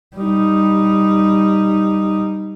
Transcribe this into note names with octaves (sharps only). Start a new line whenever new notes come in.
G3 D#4